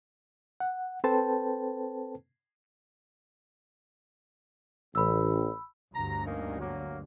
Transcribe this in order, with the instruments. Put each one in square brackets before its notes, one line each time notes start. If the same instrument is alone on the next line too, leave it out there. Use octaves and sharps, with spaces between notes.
[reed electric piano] F#5
C4 A4 B4 C5 G5 A5
[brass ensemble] A1 [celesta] B5 E6
[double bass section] G1 D2 G2 [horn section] A#5
[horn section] A#3 C#4 D#4
F#3 A#3